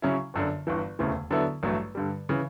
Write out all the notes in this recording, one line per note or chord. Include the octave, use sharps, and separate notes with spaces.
C#3 F#3 C#4 E4
G1 F#2 D3
G1 G2 E3
E1 D2 C#3 E3 A3
D3 F#3 B3 E4 A4
A1 G2 F#3 A3
G2 D3 G3
C#3 E3